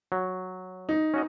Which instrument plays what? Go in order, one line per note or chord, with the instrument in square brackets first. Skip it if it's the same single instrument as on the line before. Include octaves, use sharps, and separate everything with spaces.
[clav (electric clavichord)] F#3
[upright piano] D#4
[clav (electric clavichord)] C#4 F#4 D#5